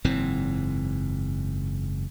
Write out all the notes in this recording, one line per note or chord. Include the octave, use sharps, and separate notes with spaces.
F#1 G#2 E3 C4